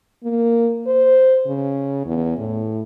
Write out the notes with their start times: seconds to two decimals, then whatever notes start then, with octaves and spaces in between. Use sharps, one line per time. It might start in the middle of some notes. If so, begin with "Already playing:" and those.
0.24 A#3
0.87 C5
1.46 C#3
2.06 E2
2.38 A2